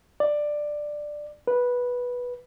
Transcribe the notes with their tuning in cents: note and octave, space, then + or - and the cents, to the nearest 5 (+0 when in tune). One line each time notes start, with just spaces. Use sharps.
D5 +10
B4 -10